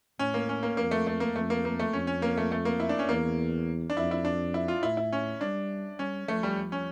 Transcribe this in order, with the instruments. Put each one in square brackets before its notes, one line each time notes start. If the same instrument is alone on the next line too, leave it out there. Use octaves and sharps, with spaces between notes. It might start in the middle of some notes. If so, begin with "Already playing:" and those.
[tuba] A2 [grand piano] C#4
[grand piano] A#3
C#4
A#3
[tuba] F2 [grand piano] A#3
[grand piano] A3
A3
A#3
[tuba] F2 [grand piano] A3
[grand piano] A#3
A#3
A3
[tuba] F2 [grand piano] C#4
[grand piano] C#4
A#3
A3
A3
A#3
E4
D4
C#4
[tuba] E2 [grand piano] A#3
[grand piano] D4
[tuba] F2 [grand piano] E4
[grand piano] E4
D4
E4
F4
[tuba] A2 [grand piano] E4
[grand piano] E4
C#4
[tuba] G3 [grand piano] D4
[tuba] G3 [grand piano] C#4
[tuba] F3 [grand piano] A3
[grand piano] G3
C#4